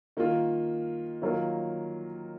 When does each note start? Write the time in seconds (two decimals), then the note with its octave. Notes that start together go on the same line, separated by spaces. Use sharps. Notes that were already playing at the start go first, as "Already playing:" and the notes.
0.17 D#3 A#3 F4
1.22 D#3 F#3 A#3 F4 A#4